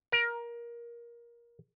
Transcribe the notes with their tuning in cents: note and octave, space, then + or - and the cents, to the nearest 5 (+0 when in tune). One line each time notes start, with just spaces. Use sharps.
A#4 +20